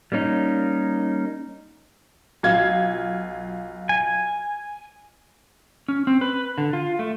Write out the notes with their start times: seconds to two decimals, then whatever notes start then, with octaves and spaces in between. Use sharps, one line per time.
0.12 G3 A#3 C#4 D#4
2.43 B1 F4 G#6
3.89 G#5
5.88 C#4
6.07 C4
6.21 B4
6.58 D3
6.73 F4
6.99 A3